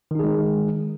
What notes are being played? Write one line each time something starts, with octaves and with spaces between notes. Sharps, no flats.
D#3 G#3 D#4 G#4